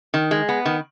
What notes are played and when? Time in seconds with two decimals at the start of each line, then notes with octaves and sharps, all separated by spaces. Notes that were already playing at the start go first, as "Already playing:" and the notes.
0.14 D#3
0.31 G#3
0.49 B3
0.66 D#3